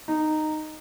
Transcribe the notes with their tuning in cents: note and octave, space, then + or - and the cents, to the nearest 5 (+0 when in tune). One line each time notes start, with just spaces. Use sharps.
D#4 -10